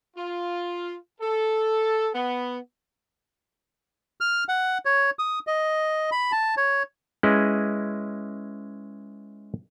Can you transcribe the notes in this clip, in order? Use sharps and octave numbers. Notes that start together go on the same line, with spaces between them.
F4
A4
B3
F6
F#5
C#5
D#6
D#5
B5
A5
C#5
G#3 C#4 E4 G#4 B4 D#5